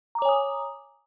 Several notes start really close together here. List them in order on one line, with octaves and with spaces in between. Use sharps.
A#5 D6 C#5 G#5 D#6